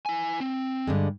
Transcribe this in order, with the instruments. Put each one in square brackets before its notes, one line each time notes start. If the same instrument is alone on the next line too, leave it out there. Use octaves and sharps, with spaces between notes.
[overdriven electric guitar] E4 G#5
C4
[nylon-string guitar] G2 D3 G#3